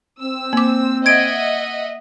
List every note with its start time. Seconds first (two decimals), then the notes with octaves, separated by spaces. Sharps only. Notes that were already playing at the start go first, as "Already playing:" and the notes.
0.20 C4 E6
0.53 A#3 D6
1.06 D#5 E5 F#5 G#6 D7